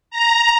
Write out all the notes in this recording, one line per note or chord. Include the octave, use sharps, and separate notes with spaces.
A#5